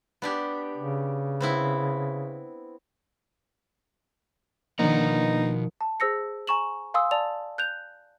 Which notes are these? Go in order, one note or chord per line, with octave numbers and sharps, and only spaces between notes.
B3 D4 G4
C#3
B3 C4 E4
B2 D#3 F3 A#3 D4 D#4 F#5 A#5
A5
G#4 C5 E6 A#6 C#7
G#5 A#5 C#6 E7 F#7
F5 G#5 C6 D#6 E6
D5 A5 F7
F#6 G6 F7